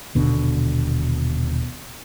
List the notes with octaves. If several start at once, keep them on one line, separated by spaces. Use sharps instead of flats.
D#1 B2 D3